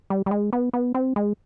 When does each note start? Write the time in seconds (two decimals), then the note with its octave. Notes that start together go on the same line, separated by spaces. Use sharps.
0.10 G3
0.26 G3
0.31 G#3
0.53 B3
0.73 B3
0.94 C4
1.16 G#3